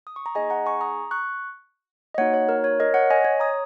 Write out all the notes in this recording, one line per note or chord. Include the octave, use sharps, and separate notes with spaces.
D#6
C#6
A#5
A#3 D#4 G#4 D#5 G#5
F#5 A#5
G#5 C#6
A#5 D#6
C#6 F#6
D#5
A#3 D#4 F#4 C#5 F#5
C#5
A#4
C#5
A#4 D#5
C#5 F#5
D#5 G#5
C#5
A#5 D#6